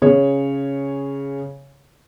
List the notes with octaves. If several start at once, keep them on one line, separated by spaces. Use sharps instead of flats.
C#3 G#4 C#5